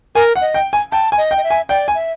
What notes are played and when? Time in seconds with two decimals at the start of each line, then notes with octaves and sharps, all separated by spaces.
0.15 A#4 G#5
0.35 F#5
0.41 D#5
0.54 G5
0.73 G#5
0.92 G5 A5
1.12 G#5
1.18 D#5
1.31 G5
1.37 D#5
1.44 E5
1.50 G#5
1.69 D5 G5
1.88 G#5
1.95 E5